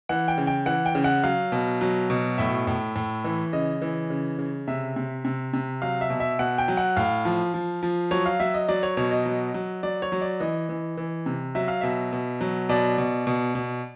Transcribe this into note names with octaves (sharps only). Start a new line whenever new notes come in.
E3 F#5
G5
C#3
G5
E3 F#5
G5
C#3
F#5
F#3 F5
B2
F#3
B2
A2 E5
A2
A2
E3
C#3 D#5
E3
C#3
C#3
C3 E5
C3
C3
C3
F#3 F5
E5
B2
E5
B2 F#5
G5
F#3
F#5
A2 F5
F3
F3
F3
F#3 C#5
F5
F#3 E5
D#5
F#3 D5
C#5
B2 C#5
D#5
F#3
F#3
F#3 D5
C#5
F#3
D5
E3 D#5
E3
E3
C3
F#3 E5
F5
B2 E5
B2
F#3
B2 D5
B2
B2
B2